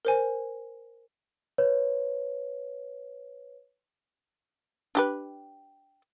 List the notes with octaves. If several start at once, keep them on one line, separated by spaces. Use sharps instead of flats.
A#4 C5 G#5
B4 C#5
D4 G4 B4